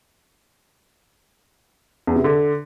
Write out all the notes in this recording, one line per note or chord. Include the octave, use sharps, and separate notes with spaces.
E2
C3
D3